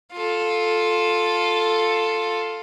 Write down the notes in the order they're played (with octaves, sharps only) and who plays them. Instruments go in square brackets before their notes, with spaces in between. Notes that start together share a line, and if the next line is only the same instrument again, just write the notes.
[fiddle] F4 A4